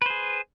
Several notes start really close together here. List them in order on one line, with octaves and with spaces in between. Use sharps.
B4 C5 G#4